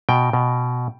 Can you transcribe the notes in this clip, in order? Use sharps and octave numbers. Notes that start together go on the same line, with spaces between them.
B2 G5
B2